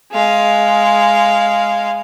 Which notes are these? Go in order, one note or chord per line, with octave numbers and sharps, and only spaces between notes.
G#3 F5